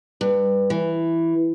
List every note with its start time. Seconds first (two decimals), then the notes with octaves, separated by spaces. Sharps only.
0.21 G2
0.70 E3